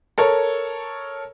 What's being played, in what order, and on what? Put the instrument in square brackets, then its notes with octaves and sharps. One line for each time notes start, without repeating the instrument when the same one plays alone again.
[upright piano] A4 A#4 C#5